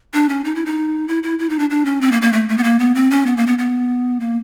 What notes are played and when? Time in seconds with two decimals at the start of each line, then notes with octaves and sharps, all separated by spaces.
0.14 D4
0.29 C#4
0.44 D#4
0.55 E4
0.66 D#4
1.08 E4
1.23 E4
1.39 E4
1.49 D#4
1.59 D4
1.70 D4
1.85 C#4
2.01 C4
2.12 A#3
2.22 A#3
2.32 A3
2.49 A3
2.58 B3
2.63 A#3
2.79 B3
2.95 C4
3.11 C#4
3.26 B3
3.37 A#3
3.47 B3
3.58 B3
4.20 A#3